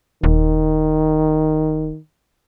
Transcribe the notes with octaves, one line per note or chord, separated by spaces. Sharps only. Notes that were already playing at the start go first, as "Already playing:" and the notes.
D#1 D#3